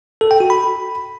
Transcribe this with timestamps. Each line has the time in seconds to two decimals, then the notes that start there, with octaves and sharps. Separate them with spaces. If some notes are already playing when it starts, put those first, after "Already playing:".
0.21 A4
0.31 G5
0.40 F#4
0.50 B5